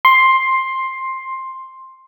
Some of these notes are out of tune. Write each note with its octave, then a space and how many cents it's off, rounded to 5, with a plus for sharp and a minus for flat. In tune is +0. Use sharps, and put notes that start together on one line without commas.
C6 +10